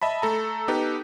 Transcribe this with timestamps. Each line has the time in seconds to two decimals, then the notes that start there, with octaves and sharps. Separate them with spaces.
0.02 D#5 E5 A5 B5
0.22 A3 A4 A#5
0.68 B3 D#4 G4 A4 B4